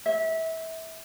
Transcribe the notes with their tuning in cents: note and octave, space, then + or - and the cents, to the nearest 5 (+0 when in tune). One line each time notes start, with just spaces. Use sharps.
E5 -25